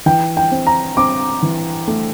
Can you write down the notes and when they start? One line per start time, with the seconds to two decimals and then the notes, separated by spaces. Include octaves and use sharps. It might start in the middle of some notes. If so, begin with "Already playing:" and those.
0.06 E3 G5
0.37 G5
0.51 C4
0.67 A#5
0.97 C4 D6
1.42 E3
1.87 A3